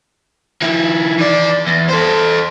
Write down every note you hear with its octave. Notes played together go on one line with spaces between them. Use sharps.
D#3 E4
E3 D5
E2
A4 C5